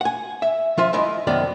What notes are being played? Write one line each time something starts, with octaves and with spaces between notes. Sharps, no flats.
F#5 G#5
E5
F3 F4 E5
G#3 E4 D#5
C2 F#2 D#3 B3 D5